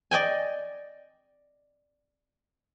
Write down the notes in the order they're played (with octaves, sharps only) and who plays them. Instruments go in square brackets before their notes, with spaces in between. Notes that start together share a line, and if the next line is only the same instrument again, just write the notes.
[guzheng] D5 D#5 G5 G#5